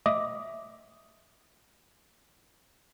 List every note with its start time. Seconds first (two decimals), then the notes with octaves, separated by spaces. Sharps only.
0.06 D#5 E5 D6 D#6